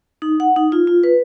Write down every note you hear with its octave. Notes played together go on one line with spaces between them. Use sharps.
D#4
F#5
D#4
F4
F4
B4